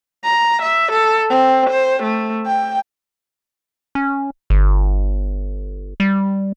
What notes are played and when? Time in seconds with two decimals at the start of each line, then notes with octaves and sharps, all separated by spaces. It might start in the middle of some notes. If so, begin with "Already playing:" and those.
0.24 A#5
0.62 E5
0.92 A4
1.30 C4
1.70 C5
2.03 A3
2.46 G5
3.95 C#4
4.50 G1
6.00 G3